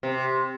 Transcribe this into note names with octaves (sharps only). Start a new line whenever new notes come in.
C3